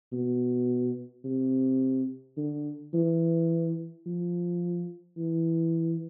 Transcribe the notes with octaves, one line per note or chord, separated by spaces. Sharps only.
B2
C3
D3
E3
F3
E3